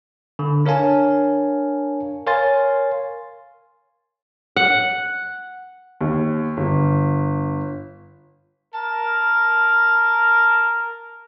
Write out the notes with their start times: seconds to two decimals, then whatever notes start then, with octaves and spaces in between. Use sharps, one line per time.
0.39 D3
0.66 D4 A#4 C#5 F5 G#5 A5
2.27 A#4 C#5 F5 G#5 C6 A6
4.56 F#5
6.01 D#2
6.57 G1
8.74 A#4 A5